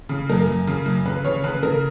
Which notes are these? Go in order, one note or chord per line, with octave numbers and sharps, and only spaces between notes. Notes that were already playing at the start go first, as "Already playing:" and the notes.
C#3
F#2 A#4
F#2
C#3
F#2
C#3 B4
C#3 C#5
C#3 B4
C#3 A#4